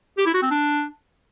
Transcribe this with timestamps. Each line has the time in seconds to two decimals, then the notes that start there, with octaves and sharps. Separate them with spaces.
0.18 G4
0.26 E4
0.34 F#4
0.42 C4
0.50 D4